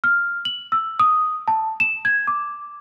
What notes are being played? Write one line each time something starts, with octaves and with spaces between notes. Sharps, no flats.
F6
F#7
E6
D#6
A5
E7
G#6
D6